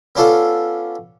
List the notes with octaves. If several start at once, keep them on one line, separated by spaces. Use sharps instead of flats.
B3 C#4 D4 F4 A4